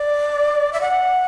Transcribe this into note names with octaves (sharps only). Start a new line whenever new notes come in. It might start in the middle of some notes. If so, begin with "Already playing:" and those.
Already playing: D5
E5
F#5